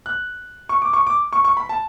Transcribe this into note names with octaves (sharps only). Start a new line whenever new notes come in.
F#6
C#6
D6
C#6
D6
C#6
C#6
B5
A5